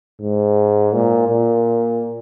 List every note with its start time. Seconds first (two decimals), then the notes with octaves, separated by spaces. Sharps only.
0.20 G#2
0.93 A#2
1.29 A#2